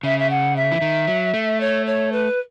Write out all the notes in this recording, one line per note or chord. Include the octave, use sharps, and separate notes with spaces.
C#3 E5
E5
F#5
E5
E3
D#3
F#3
A3
C#5
C#5
B4